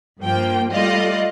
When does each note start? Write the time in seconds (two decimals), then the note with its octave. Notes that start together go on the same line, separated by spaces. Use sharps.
0.20 G2 F3 A#3 G5
0.73 G3 A3 F4 D5 D#5 F5